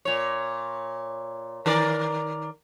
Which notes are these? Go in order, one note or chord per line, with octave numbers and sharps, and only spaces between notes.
A#2 C#5
D#3 A#4 D5